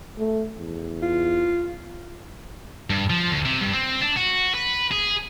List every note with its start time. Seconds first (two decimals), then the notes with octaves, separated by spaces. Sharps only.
0.18 A3
0.58 E2
1.02 F4
2.90 G2
3.10 F3
3.30 D2
3.45 C3
3.61 G2
3.73 C4
4.01 D4
4.17 F#4
4.55 B4
4.91 G#4